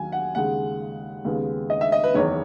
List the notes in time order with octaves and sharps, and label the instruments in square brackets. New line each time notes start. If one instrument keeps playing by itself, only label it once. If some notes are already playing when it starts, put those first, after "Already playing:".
Already playing: [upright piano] D#2 D#3 F#3 G#5
F#5
D#2 C#3 G#3 F#5
D#2 C#3 G#3 B3
D#5
E5
D#5
B4
F#1 E2 D#3 C#5